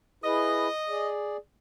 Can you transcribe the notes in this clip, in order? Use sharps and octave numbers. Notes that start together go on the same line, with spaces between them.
E4 G#4 B4 D#5
G#4 D5